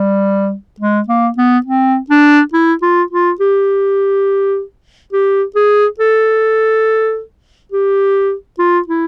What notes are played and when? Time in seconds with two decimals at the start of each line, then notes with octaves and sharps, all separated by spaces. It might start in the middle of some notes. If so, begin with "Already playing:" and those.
Already playing: G3
0.80 G#3
1.08 A#3
1.38 B3
1.66 C4
2.10 D4
2.53 E4
2.82 F4
3.11 F4
3.40 G4
5.12 G4
5.56 G#4
6.00 A4
7.72 G4
8.59 F4
8.88 E4